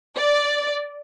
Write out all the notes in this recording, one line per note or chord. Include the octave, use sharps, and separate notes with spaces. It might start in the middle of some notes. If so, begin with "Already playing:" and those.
D5